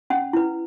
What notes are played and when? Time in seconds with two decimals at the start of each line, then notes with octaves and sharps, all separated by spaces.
0.10 C#4 F#5
0.33 E4 B4